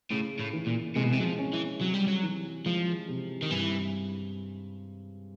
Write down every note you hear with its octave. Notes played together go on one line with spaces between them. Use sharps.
A2 C#3
A2
E3
A#2
C3 G#3
B2
C3
F#3
F3
C#4
E3
C3 F#3
G3
F#3
E3
F3 G#3
C3
D#3
G2 E3